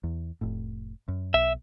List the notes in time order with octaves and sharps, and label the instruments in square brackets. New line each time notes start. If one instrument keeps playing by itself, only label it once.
[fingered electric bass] E2
F1 A2
F#2
[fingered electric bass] B1 [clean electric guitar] E5